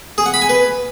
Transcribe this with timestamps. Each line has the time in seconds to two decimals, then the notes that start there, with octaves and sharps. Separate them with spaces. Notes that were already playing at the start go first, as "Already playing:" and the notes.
0.18 G#4
0.26 F#5
0.34 B5
0.42 G#5
0.49 B4